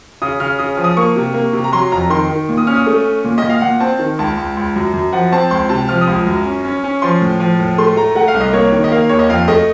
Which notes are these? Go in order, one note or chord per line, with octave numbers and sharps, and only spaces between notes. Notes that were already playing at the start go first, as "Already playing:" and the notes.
C#3 D#6
C#3 F6
C#3 D#6
F3
D#6
A#3 C#6
C3
A#3
C3
A#5
F#3 C6
F2 A#5
D#3 C6
D#3
A#2
D#6
C#4 F6
D#6
A3
C#4
A#2
A#2 D#5
F5
A#2 F#5
C4 A5
D#3
C#2 A5
C#2
C#2
F#2
F#2
F3 F#5
C4 A5
C#2 C6
C3 A5
F3 F6
D#6
C#2
F#2
C#4
C#4
C#4
F3 C6
A2
F3
A2
A3 C6
A3 A#5
A3 F#5
F5
C2
D#5
A#3 C#5
D#3
D#5
A#3 F5
D#2 C#5
D#5
F2 F5
A3 D#5